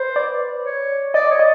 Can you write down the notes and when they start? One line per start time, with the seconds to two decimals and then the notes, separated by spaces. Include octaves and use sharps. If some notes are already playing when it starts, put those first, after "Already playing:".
Already playing: B4 C5
0.16 D5
0.64 C#5
1.14 D5 D#5
1.27 C#5 D5
1.39 D#5